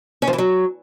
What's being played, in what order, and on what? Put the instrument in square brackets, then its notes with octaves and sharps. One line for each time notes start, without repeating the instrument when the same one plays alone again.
[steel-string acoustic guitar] C#4
F3
E3
F#3